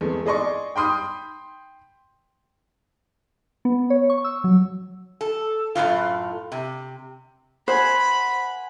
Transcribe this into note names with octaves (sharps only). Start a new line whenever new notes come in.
E2 G#3 A3 C4
G#4 D5 D#5 C6 C#6
G5 B5 C6 D#6 G6
B3
C#5
C#6
E6
F#3
A4
F#2 A2 C#3 F4
C3
C5 F#5 G#5 B5